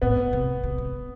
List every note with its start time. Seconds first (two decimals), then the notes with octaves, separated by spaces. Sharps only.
0.02 A2 B3
0.33 C3
0.64 C3
0.78 C3